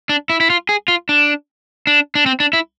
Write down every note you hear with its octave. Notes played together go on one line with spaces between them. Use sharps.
D4
E4
E4
F4
G#4
F4
D4
D4
D4
C4
D4
E4